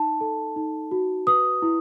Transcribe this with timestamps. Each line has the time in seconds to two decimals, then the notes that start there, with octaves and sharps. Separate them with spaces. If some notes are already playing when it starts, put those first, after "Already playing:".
Already playing: D#4 A5
0.21 A4
0.56 D#4
0.91 F#4
1.27 B4 D#6
1.62 E4